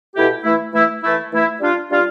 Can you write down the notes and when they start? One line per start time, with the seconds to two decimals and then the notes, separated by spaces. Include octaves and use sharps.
0.15 B2 A3 E4 G4
0.44 E3 A3 E4
0.74 E3 A3 E4
1.02 E3 A3 E4
1.31 E3 A3 E4
1.60 G3 D4 F4
1.90 G3 D4 F4